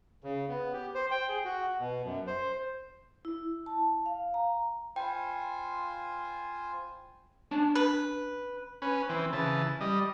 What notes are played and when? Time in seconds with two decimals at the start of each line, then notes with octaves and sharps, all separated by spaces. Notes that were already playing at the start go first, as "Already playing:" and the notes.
0.24 C#3
0.48 B3
0.73 G4
0.95 C5
1.11 G5
1.29 G#4
1.45 F#4
1.79 B2
2.04 F#2
2.27 C5
3.25 E4
3.66 A5
4.06 F5
4.34 A#5
4.96 F4 C5 G5 G#5 B5
7.51 C#4 D4 A5
7.75 B4
8.82 C#4 B4
9.09 E3 C4
9.33 C#3 E3 A5
9.81 G3 D#5